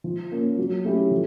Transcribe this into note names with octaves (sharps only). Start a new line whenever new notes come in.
F3
A#3 C#4
F#3
A3 C#4 E4 G4
F3